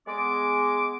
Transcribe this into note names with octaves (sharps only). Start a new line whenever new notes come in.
G#3 B3 D6